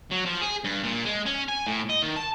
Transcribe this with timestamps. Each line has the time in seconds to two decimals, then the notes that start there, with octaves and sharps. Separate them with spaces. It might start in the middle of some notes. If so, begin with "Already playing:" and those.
0.12 F#3
0.26 F3
0.41 G#4
0.64 G2
0.83 A#2
1.05 G#3
1.26 C#4
1.48 G#5
1.67 A2
1.90 D#5
2.03 D#3
2.16 A5